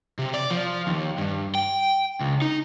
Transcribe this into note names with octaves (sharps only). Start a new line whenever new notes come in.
C3
D5
F3
D#2
G2
G5
C#2
D#4